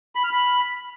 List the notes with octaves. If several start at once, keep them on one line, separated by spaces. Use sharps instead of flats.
B5
F6
B5